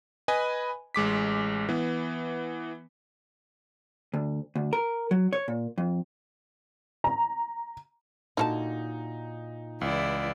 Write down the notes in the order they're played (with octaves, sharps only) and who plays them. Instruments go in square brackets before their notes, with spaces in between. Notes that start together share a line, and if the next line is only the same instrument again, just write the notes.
[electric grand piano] B4 D#5 G#5 B5
A1 G#3 D6 B6
E3 B3
[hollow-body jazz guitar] D2
D2
A#4
F#3
C#5
A#2
F2
[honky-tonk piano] A#5
[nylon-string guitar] A#2 F#4 [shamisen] D3 F4 A5 [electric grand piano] D#4
[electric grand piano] C#2 [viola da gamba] E3 E4 D5